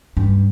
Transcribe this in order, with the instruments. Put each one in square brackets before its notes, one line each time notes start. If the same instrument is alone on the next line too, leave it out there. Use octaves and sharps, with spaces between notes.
[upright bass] G2